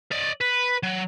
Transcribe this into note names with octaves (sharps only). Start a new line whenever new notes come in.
D5 D#5
B4
F#3